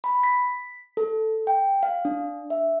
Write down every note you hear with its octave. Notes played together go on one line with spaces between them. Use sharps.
B5
B6
A4
G5
F5
D4
E5